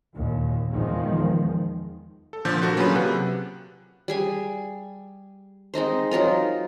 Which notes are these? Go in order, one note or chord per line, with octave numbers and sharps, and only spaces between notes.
D#2 A#2
E2 D#3 F3 G#3
A4
A#2 D3 F3 G6
D3 A#3 F#4
F#3 A#3 C#4 F4 G#4 B4
C3 F#5 F#6
G3 G#4 G#5
G#3 C4 D#4 C5
F#3 D#4 F4 A#4